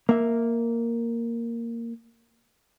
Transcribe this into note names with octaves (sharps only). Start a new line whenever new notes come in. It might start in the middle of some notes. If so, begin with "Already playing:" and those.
A#3 E5